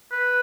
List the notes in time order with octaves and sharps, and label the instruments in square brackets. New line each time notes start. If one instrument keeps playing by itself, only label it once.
[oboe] B4